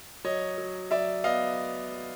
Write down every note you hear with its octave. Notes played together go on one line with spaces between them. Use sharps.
F#3 C#5 D#5
F#3
F#3 D5 E5
B3 D#5 F5